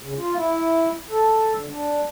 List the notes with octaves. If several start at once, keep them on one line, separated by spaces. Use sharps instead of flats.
C#3
F4
E4
A4
D3
D4